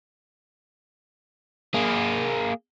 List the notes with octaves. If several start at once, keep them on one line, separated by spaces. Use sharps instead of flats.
A#3 G#4